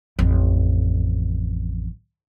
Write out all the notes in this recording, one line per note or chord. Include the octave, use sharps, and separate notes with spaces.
A1 F2